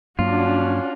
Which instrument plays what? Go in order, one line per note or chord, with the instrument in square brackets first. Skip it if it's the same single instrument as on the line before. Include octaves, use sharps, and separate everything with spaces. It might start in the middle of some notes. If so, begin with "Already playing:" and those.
[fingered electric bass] G2 F#3 A#3 [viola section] C#4 D4 F#4 [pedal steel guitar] F4